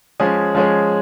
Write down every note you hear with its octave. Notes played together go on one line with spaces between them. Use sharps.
F3 G#3 C#4 G#4
F3 G#3 C#4 G#4